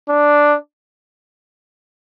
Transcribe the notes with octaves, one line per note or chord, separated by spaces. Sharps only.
D4